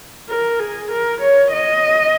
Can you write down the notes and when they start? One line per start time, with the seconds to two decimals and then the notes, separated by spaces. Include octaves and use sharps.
0.29 A#4
0.59 G#4
0.91 A#4
1.21 C#5
1.52 D#5